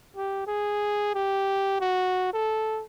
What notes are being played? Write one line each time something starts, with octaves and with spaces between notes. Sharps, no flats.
G4
G#4
G4
F#4
A4